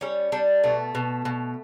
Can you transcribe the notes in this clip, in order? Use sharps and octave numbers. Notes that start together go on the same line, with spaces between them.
G3 C#4
G3 D4
B2 A3
B2
B2